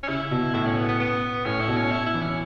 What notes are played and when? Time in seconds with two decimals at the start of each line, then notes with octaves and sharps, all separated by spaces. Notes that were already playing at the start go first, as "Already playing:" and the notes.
0.03 C#4
0.08 C#3 E4
0.31 B2
0.54 A2 E4
0.66 C#4
0.77 B3
0.88 B3
1.00 B3
1.45 A2 C#4
1.61 E4
1.68 B2
1.76 C#4
1.91 E4
2.06 E4
2.14 E3
2.22 C#4